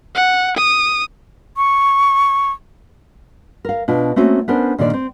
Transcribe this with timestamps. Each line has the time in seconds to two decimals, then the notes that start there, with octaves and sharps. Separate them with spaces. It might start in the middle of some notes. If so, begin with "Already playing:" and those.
0.15 F#5
0.57 D#6
1.57 C#6
3.65 A#4 F5
3.88 B2 D4 F4
4.16 A3 A#3 C4 C#4 F#4
4.48 B3 C#4 D4 A#4 C5
4.78 A#2 D3 D#3 D4 D5
4.93 C4